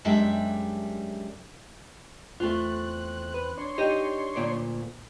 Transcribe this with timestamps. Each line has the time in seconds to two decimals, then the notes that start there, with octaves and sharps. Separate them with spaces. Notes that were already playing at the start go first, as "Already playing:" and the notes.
0.05 F#2 G3 G#3 D4 E5 G5
2.40 E2 A3 C4 F4 F#6
3.34 B4
3.58 D4 C#5 C6
3.78 D#4 G4 D#5
4.36 D2 A#2 D5